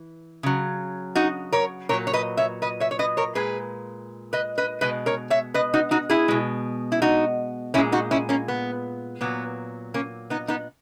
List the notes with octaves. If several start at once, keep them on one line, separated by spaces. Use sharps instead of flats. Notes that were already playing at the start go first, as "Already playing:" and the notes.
Already playing: E3
C#3 F#3
D#4 F#4
A#4 C#5
A#2 F#3 A#4 C#5
C#5
B4 D#5
C#5 E5
B4 D#5
C#5 E5
C#5
B4 D#5
A#4 C#5
A#2 G#3 G#4 B4
B4 D#5
B4 D#5
B2 G#3 B4 D#5
A#4 C#5
C#5 E5
B4 D#5
D#4 F#4
D#4 F#4
E4 G#4
B2 G#3
E4
D#4 F#4
A#2 G#3 C#4 E4
D#4 F#4
C#4 E4
A#3 C#4
B3
A#2 F#3 B3
A#3 C#4
B3 D#4
B3 D#4